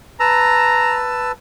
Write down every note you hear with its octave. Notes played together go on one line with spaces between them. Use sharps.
B4 A5 A#5 E6